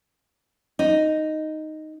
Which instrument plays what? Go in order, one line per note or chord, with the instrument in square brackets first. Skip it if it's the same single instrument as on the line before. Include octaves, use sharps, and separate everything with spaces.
[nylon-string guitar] D#4